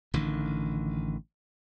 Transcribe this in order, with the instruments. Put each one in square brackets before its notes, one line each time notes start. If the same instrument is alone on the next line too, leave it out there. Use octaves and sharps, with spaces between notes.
[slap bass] A1 D3 D#3